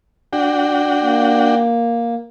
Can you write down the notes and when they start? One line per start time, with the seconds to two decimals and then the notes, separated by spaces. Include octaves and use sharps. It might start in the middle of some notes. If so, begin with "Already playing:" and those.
0.33 D4 F#4 G5
1.02 A#3